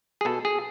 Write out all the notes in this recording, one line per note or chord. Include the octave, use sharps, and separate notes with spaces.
G#4
B2 A4
G#4